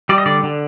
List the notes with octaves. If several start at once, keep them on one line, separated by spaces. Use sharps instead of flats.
G3 D5
D#5
D3 D5
D3